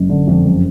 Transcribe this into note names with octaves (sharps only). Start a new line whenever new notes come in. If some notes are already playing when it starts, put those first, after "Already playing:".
Already playing: F#1
D3
F2
F#1